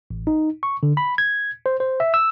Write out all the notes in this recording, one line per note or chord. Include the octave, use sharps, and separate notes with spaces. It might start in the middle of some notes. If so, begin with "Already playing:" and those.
A1
D#4
C#6
D3
B5
G#6
C5
C5
E5
E6